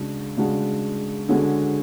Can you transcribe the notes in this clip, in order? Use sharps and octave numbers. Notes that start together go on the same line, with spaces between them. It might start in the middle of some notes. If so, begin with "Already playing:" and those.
Already playing: C#3 G#3 D4 F#4
C#3 G#3 D4 F#4
D3 G#3 C#4 F#4